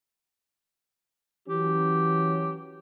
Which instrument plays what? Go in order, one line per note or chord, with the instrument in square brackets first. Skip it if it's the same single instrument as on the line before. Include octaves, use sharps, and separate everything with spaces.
[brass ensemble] E3 F#3 C#4 [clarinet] G4